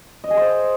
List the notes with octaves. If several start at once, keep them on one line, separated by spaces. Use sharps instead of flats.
D#5
G#4
C5